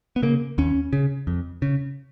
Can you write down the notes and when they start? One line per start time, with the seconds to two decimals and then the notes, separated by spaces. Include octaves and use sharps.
0.16 B3
0.22 C#3 A#3
0.58 D#2 C#4
0.93 C#3
1.27 F2
1.62 C#3